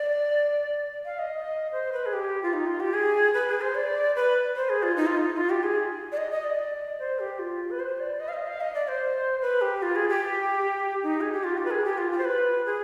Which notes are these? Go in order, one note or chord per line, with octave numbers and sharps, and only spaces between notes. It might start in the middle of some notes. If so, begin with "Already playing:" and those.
Already playing: D5
F5
D#5
C5
B4
G#4
G4
F4
D#4
F4
G4
G#4
B4
G#4
C5
D5
B4
C5
G#4
F4
D#4
F4
D#4
F4
G4
G#4
D5
D#5
D#5
D5
C5
G4
F4
B4
C5
D5
D#5
F5
D#5
F5
D#5
D5
C5
B4
G4
F4
G#4
G4
D#4
G#4
G4
F4
G4
B4
G#4
G4
F4
F4
C5
B4
G#4